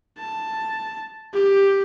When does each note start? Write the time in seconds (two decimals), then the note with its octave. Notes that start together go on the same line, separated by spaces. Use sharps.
0.19 A5
1.33 G4